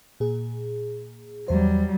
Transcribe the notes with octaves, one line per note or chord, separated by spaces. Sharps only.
A#2 G#4
E2 F#3 G3 C5